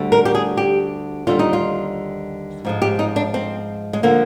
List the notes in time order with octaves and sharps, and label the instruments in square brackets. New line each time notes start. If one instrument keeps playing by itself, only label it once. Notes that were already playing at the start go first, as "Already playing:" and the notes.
Already playing: [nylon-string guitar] D2 D3 G3
A#4
G4
G#4
G4
D#2 D3 G3 F4
D#4
F4
G#2 F3 G#3
G4
D#4
D4
C4
G#3
D3 F3 A#3